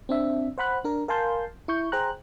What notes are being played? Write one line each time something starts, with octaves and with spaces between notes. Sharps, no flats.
C4 D4 E5
C5 F#5 B5 F#6
D4 A#4
A#4 F5 G#5 A5 C6 G6
E4 C#6 G6
G#4 C5 G5 A#5 F#6